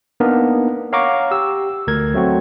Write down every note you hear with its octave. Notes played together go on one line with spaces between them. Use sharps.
A#3 B3 D4 D#4 A#4
C#5 F5 F#5 A#5 C#6 D6
G4 E6
D2 A#4 G#6
F#3 A3 C4 F#4